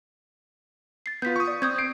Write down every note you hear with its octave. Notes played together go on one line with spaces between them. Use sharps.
A6 C7
B3 F4 G6 B6
C#6 D#6
D5
C4 D#6 G6 G#6
C7 D7